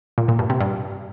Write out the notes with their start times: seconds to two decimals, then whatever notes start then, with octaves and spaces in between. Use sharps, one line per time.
0.18 A#2
0.28 A#2
0.39 G2
0.50 C3
0.60 G2